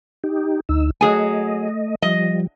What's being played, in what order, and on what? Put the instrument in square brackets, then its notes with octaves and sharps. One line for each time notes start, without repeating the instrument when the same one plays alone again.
[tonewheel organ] D#4 G4
D2 D#4 E6
[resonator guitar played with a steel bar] F#3 G#4 G#5 [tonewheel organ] A3 D#5
[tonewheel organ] F3 G3 [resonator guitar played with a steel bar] D#5